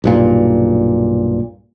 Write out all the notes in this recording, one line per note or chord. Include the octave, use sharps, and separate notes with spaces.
B1 G2 A#2